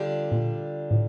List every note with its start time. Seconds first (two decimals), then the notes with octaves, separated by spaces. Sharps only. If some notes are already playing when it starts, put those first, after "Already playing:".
Already playing: D3 G3 D4 F4
0.32 A#2
0.91 A2